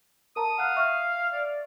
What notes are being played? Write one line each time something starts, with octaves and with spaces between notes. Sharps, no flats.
A#4 A5 A#5 D#6
F5 F#5 F#6
E5 C#6 F6
D5